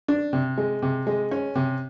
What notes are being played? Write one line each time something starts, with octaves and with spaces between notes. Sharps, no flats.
D4
C3
G#3
C3
G#3
C#4
C3